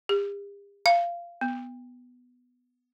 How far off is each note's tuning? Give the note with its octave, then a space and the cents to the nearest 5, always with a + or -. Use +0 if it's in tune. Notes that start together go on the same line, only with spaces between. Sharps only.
G4 +45
F5 -15
B3 +5